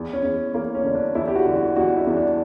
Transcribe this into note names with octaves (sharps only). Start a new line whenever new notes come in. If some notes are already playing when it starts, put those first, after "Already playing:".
Already playing: E2
C#4
E2
E2 A#3
C#4
D3
D4
E2 E4
G4
F#4
D3
F#4
E2 F#4
E4
E2
D4